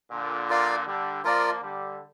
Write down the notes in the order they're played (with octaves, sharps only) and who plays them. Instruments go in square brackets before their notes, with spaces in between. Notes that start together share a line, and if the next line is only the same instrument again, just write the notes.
[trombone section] A#2 D3
[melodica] F4 A#4 D5 F5
[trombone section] D3 G3
[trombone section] F3 A#3 [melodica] F4 A#4 D5
[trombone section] D3 G3